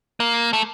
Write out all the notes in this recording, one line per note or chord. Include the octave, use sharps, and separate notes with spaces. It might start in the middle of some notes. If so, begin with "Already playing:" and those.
A#3
A3